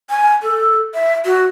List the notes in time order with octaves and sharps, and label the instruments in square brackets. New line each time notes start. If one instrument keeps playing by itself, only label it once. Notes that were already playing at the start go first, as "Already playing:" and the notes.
[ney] G#5
A4
E5
F#4